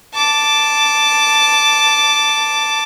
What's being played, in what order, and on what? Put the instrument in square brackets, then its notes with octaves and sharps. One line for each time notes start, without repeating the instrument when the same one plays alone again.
[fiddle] A5 D6